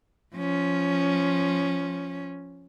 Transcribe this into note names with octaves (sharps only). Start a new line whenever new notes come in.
F3 C#4